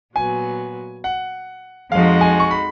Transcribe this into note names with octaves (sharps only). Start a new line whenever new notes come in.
A#2 F#3 B3 G#5
F#5
F2 F3 G#3 D#4 F#4 F5
G#5
C#6
B5